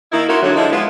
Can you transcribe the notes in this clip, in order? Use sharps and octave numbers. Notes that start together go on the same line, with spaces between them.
D#3 A#3 D#4 E4
C#4 D#4 F4 F#4 A#4 E5
D3 F#3
D3 F3 G#3 D#4 E4
G#3 B3 F4